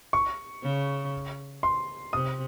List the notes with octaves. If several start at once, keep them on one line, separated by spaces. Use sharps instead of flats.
C#6
C#3
C6
C3 D#6